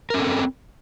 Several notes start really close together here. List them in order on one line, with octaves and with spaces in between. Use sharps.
A#4 C#4 A4 C4